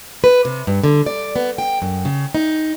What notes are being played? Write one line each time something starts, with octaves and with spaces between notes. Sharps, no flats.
B4
C3
G2
D3
D5
B3
G5
F#2
C#3
D#4